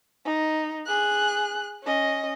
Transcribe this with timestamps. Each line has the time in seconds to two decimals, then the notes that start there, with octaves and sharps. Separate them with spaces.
0.25 D#4
0.87 G#4 F#6
1.83 C#4 D#5